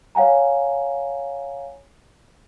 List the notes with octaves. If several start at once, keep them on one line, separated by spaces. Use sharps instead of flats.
C#5 F5 F#5 G#5 A#5